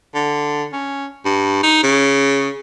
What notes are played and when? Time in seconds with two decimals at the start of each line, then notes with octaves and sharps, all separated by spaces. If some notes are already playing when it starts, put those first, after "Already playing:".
0.15 D3
0.73 C#4
1.25 G2
1.63 D#4
1.83 C#3